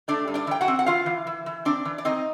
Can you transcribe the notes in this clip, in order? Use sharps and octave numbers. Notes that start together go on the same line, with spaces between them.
A3 D4 D5
G2
D4 D5
E3 G5
F#4 F#5
C4
F#5
E3 F4 F5
E3
E3
E3
C4 D4 D5
E3
D5
C4 D#4 D#5